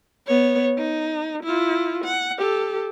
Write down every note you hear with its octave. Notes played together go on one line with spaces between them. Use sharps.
B3 C#5
D#4
E4 F4
F#5
G4 A4